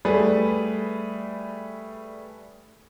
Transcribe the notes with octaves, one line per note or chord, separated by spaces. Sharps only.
G3 A3 G#4 B4